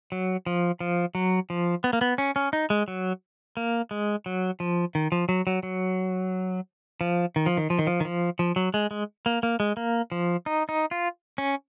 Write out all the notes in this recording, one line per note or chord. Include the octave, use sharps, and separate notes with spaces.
F#3
F3
F3
F#3
F3
B3
A#3
B3
C#4
C#4
D#4
G#3
F#3
A#3
G#3
F#3
F3
D#3
F3
F#3
F#3
F#3
F3
D#3
F3
D#3
F3
D#3
F3
D#3
F3
F3
F#3
G#3
G#3
A#3
A#3
G#3
A#3
F3
D#4
D#4
F4
C#4